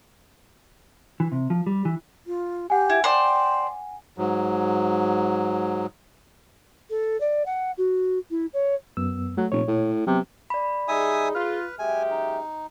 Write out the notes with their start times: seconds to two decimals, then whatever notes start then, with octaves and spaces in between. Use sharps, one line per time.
1.20 E3
1.32 C3
1.50 F3
1.67 G3
1.85 E3
2.27 F4
2.70 G4 F#5 G#5
2.90 E4
3.04 C5 D5 G5
4.18 G#2 F#3
6.90 A4
7.20 D5
7.46 F#5
7.78 F#4
8.30 E4
8.53 C#5
8.97 F#2 B3 E6
9.37 F#3 A3
9.52 F1 A#2 C#5
9.67 A2
10.07 C3 F#3 B3
10.50 D5 B5
10.88 G3 D#4 G#4 E5 G#5 D#6
11.35 F4 B4 F6
11.79 F#2 G#3 G4 E5 G#5
12.11 D#4